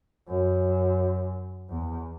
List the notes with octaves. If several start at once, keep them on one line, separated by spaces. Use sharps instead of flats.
F#2
E2